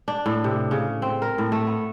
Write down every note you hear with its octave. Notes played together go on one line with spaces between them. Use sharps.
D4
A2
C3
C#3
C4
A#4
A2
A3
B3